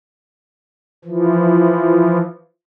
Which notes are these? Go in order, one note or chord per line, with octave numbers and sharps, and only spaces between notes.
E3 F3